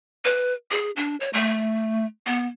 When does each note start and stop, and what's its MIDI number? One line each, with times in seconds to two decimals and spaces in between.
0.25 0.54 71
0.71 0.91 68
0.96 1.16 62
1.20 1.30 73
1.33 2.06 57
2.26 2.47 59